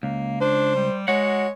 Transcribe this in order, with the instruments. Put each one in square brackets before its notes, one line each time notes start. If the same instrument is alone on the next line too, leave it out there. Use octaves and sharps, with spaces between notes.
[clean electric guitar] C#2 [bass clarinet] A#3
[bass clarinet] D4 [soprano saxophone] C5
[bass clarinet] G3
[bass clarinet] G#3 [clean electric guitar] F#4 F#5 [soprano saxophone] C#5